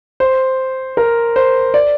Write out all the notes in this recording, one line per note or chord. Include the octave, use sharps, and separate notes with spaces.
C5
A#4
C5
D5